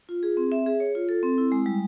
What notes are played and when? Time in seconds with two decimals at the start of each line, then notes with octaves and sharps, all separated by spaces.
0.09 F4
0.23 G#4
0.37 C4
0.52 E5
0.66 G#4
0.80 C#5
0.95 F4
1.09 A4
1.23 C4
1.38 E4
1.52 G#3
1.66 G3